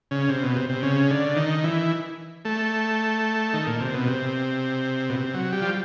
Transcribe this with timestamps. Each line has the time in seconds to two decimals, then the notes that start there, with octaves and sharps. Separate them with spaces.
0.11 C#3
0.29 C3
0.43 B2
0.56 C3
0.69 C3
0.83 C#3
1.10 D3
1.36 D#3
1.64 E3
2.45 A3
3.54 D#3
3.67 A#2
3.81 C3
3.94 B2
4.07 C3
5.09 B2
5.16 C3
5.34 F#3
5.52 G3
5.61 F3